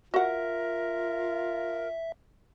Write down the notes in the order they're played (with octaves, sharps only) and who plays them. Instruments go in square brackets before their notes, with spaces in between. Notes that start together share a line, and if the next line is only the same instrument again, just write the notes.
[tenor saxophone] F4 [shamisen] F#4 F#5 [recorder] A#4 [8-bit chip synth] E5